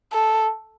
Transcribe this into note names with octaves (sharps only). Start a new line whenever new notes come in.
A4